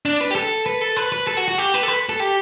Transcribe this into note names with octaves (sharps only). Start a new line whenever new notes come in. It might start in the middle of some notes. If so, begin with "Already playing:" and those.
D4
B4
G4
A4
B4
A4
B4
B4
A4
F#4
F#4
G4
B4
A4
B4
A4
G4